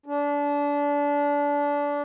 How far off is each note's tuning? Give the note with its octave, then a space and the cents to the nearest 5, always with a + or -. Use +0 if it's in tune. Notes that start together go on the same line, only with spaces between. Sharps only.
D4 -25